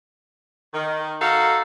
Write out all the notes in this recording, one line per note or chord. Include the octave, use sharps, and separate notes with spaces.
D#3
D#4 F#4 A4 F5